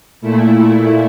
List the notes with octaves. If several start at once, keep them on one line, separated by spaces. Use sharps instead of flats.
A#2 A3 E4